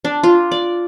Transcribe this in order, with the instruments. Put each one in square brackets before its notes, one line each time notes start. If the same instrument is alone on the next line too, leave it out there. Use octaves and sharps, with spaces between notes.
[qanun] D4
F4
D5